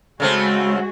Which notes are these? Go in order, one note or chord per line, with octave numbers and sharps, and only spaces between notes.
C#3 G#3 A3 C4 F#4